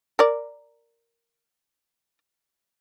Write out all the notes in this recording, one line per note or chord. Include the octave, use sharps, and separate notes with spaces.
A#4 D5